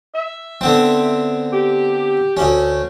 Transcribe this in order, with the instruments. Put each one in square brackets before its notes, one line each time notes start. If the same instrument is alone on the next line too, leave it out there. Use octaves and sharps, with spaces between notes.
[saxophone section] E5
[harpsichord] D3 B3 C4
[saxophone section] G4
[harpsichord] D2 C#4